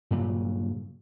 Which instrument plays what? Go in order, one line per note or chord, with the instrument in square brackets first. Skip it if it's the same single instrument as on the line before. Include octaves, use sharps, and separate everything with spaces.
[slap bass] G2 A#2 C#3 F#3